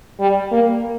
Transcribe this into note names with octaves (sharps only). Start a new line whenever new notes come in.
G3
A#3